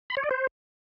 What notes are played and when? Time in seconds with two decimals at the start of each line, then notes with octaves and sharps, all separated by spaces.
0.10 B5
0.17 C#5
0.24 D5
0.31 C5